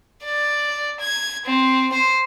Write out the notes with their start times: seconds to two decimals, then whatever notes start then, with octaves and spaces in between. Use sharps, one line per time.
0.24 D5
1.00 G#6
1.46 C4
1.93 C5